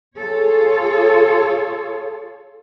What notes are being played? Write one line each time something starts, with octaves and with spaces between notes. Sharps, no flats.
F4 G#4 A4 C#5